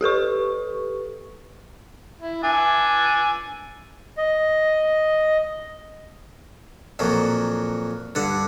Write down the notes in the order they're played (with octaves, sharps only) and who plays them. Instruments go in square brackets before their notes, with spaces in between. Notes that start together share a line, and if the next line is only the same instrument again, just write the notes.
[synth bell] G4 A4 B4 C#6
[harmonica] E4
[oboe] D4 [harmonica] G#5 E6
[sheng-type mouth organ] D#5
[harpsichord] F2 A#2 F#3
G2 D3 F#5